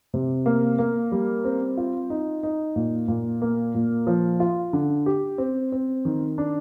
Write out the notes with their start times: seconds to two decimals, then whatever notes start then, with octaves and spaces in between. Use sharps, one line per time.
0.14 C3
0.46 A#3
0.79 A#3
1.12 G3
1.45 C4
1.77 F4
2.10 D#4
2.43 D#4
2.76 A#2
3.08 A#2
3.42 A#3
3.75 A#2
4.07 F3
4.40 F4
4.73 D3
5.06 G4
5.38 C4
5.72 C4
6.05 D#3
6.38 D4